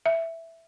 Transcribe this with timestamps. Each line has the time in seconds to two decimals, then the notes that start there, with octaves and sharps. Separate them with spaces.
0.06 E5